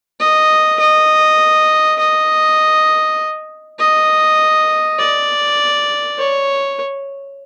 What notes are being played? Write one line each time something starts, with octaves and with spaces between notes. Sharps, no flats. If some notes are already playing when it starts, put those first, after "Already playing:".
D#5
D#5
D#5
D#5
D5
C#5